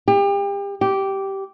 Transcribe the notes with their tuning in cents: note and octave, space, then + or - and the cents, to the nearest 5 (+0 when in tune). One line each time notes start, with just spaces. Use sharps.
G4 +35
G4 -10